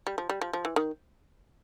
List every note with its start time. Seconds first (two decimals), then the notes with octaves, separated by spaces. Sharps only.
0.07 G3
0.18 F3
0.29 G3
0.41 F3
0.53 F3
0.65 E3
0.76 D#3